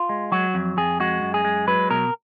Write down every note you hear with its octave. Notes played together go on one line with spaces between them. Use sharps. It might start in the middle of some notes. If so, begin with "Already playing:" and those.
Already playing: F4
G#3
F#3 F#4
F2
F2 G#4
G#3 F#4
F#2
G#4
G#3
F#3 B4
B2 A#4